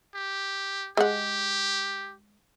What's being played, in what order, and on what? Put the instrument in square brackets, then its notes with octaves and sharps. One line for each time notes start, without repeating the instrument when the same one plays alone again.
[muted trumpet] G4
[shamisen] G#3 F#5 [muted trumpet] G4